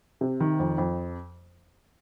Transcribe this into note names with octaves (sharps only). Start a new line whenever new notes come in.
C3
D#3
F2
F2